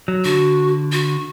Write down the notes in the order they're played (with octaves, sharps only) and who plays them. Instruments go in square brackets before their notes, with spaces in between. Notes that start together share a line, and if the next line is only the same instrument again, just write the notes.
[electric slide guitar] F#3
[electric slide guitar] D3 [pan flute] F#4
[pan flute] F#4